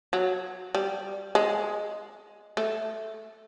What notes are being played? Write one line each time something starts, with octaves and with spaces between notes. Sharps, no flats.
F#3
G3
G#3
A3